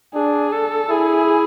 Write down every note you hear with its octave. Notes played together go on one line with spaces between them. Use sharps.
D4 G#4
A4
E4 G#4